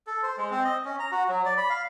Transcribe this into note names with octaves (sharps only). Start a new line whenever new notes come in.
A4
C5
G#3
C4
D#5
C#4
A#5
F#4
F#3
D5
B5
F5